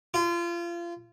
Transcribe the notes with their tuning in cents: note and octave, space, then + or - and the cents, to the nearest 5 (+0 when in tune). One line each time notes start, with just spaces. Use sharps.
F4 -30